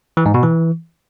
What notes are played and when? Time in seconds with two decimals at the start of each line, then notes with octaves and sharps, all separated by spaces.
0.17 E3
0.26 G#2
0.34 B2
0.43 E3